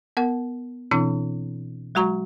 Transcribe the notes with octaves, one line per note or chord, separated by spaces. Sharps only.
B3 A#4 F#5
B2 E3 C4 D4 E4
F#3 G#3 F#4 A#5 C#6